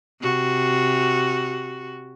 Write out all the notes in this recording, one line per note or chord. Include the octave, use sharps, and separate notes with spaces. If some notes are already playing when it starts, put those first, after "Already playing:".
C3 F#4